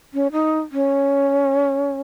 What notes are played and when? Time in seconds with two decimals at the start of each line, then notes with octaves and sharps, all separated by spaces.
0.14 C#4
0.33 D#4
0.72 C#4